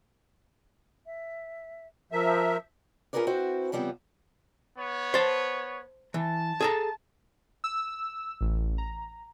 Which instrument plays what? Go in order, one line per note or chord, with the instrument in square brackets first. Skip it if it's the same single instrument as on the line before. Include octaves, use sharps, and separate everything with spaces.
[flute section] E5
[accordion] F3 E5 [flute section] A#4 A5 A#5
[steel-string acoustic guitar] C#4 F4 G#4 A#4 B4 D5
C4 E4 F#4 B4 C5
C#3 F3 G3 B3 C4
[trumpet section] B3 C#5
[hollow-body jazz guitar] C5 A5
[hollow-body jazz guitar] E3 [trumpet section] A5
[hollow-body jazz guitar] G#4 A4 A#5
[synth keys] E6
A1
A#5